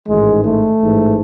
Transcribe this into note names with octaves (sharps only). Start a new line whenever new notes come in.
A1 G#2 D#3 G#3
A3
A1 G#2 E3